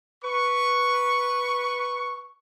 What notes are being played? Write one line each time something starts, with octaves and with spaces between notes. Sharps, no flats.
B4 C#6